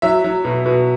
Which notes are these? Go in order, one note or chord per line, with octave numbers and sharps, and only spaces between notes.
F#3 E5
F#3
B2
B2